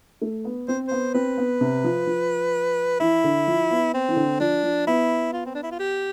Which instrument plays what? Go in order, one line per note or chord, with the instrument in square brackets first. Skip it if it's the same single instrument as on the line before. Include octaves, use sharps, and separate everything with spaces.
[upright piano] A3
B3
[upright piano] C4 [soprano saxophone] C5
[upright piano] B3 [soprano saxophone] C5
[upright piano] C4 [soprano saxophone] B4
[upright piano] B3
C3
F3
F3
[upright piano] E3 [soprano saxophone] E4
[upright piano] D3
F3
B3
[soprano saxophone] C4
[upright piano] E3
D3
[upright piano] F3 [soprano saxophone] D4
[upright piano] F3
[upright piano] B3 [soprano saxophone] E4
[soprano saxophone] F4
C4
D4
E4
F4
G4